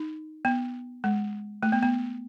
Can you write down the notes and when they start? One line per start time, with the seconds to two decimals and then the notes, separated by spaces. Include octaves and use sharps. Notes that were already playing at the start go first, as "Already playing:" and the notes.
Already playing: D#4
0.45 B3
1.04 G#3
1.63 A3
1.72 B3
1.83 B3